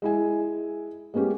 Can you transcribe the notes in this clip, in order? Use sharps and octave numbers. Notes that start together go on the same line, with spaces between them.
G#3 E4 G#5
G#3 A#3 B3 C#4 G4